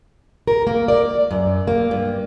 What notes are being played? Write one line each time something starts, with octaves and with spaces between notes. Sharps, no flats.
A#4
A#3
D5
F#2
A#3
G2